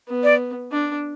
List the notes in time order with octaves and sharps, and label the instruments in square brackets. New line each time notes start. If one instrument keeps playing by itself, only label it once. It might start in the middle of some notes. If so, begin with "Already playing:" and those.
[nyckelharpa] B3
[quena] D5
[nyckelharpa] D4